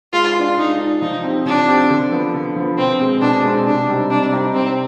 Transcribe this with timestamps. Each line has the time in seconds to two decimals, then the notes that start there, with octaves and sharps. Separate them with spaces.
0.13 G#3 F4
0.36 D4 F4
0.58 G#3 D#4
0.79 D4 F4
1.01 F3 D#4
1.24 C4 G4
1.46 F3 D4
1.68 C4 G4
1.90 D3
2.12 F3 B3
2.34 D3
2.56 F3 B3
2.78 B2 C4
2.99 G#3 C4
3.22 B2 D4
3.44 G#3 C4
3.66 C3 D4
3.89 G3 C4 D#4
4.10 C3 D4
4.32 G3 C4 D#4
4.55 C3 C4